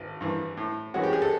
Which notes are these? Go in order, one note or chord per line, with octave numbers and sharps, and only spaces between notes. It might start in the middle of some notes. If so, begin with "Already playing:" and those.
Already playing: G#1
G2 E3
A2
E3 G#3 C#4 F#4
G4
G#4
A4